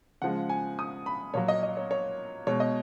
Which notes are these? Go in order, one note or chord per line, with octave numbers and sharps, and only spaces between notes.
C#3 F3 G#3 F#5
G#5
D#6
B5
A#2 F#3 C#5
D#5
D#5
C#5
C#5
B2 G#3 C#5
D#5